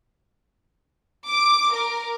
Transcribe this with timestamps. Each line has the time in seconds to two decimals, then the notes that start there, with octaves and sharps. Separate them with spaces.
1.30 D6
1.73 A#4